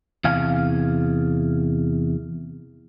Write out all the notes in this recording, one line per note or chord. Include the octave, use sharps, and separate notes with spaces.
E2 C3 F5 G#5